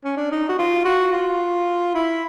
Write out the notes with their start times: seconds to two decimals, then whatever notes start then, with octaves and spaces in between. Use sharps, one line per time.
0.04 C#4
0.17 D4
0.31 D#4
0.49 F#4
0.59 F4
0.85 F#4
1.13 F4
1.95 E4